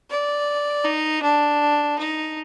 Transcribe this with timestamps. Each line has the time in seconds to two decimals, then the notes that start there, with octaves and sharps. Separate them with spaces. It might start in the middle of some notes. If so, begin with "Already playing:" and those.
0.10 D5
0.85 D#4
1.22 D4
1.99 D#4